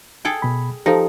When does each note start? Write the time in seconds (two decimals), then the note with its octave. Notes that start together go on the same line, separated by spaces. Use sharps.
0.25 G#4 A4 G5
0.42 B2 B5
0.86 F3 D#4 G4 A4